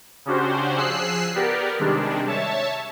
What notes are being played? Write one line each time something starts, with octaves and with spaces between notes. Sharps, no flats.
C#3 C#4 D4 F#4 G4 C5
F3 G#4 E6 F#6 C7
B3 G4 A#4 D5
C3 D#3 G3 G#3 D4
C#5 E5 A5